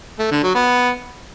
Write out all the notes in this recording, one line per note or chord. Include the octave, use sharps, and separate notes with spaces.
A3
D3
F#3
B3